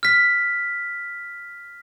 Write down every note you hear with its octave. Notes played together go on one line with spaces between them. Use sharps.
F6 B6